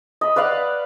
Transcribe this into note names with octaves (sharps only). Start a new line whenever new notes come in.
D#5 B5
B4 D5 F5 F#5